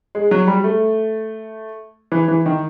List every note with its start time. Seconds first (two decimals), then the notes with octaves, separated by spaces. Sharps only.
0.15 G#3
0.31 F#3
0.47 G3
0.64 A3
2.12 E3
2.28 E3
2.46 D#3